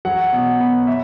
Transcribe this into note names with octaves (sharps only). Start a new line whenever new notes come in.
F#3 F#5
B2
B3
E5